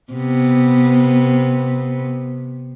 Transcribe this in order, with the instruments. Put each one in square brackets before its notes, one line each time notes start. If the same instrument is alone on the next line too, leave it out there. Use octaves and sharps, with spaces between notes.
[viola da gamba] C3 B3